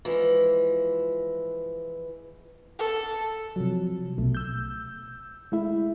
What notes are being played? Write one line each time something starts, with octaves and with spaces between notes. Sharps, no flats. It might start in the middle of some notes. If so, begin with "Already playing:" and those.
E3 F3 G#3
A4
C3 F3 F#3
B1 B2 A3
E6 G6
G#3 A3 E4 E5